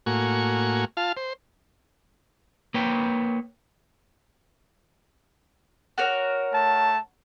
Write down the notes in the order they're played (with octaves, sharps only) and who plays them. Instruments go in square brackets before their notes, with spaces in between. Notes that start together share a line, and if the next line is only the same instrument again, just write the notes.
[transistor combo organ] A2 A#3 F#4 G#5 C#6
F4 F5 A5
C5
[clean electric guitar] A#3 B4 C#5 G5
[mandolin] F#4 A#4 C#5
[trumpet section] A3 A5